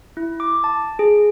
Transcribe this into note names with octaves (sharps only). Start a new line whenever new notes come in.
E4
D6
A5
G#4